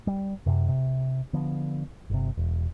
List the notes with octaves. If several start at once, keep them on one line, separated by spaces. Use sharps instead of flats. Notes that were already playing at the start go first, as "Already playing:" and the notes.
G3
F#2 C3
C3
D3 F3 B3
G1 C3
E1